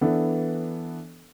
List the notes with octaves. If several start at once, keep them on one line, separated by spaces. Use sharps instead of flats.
E3 B3 D4 A4